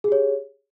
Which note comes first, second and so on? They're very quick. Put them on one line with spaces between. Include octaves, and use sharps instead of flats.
G#4 G4 C#5